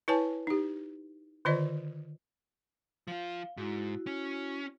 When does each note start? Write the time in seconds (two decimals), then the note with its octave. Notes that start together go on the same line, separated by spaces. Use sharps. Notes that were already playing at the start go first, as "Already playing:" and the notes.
0.08 E4 B4 C#5 G#5 A5
0.47 D#4 G4
1.45 D3 D#3 F4 C5 D5 D#5
3.08 F3 F4 F5
3.57 G#2 E4 F#4
4.07 C#4